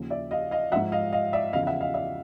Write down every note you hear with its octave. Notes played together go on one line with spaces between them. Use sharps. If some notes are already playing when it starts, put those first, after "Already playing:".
Already playing: D#2 C#3 F3
D5 E5
D#5 F5
D#5 F5
G#2 F3 E5 F#5
D#5 F5
D#5 F5
D5 E5
E2 C#3 F3 D#5 F5
F5
E5 F#5
D#5 F5
D5 E5